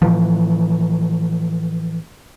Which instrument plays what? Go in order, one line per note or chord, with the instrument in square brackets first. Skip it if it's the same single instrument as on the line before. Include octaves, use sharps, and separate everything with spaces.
[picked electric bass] A2 C#3 E3 F3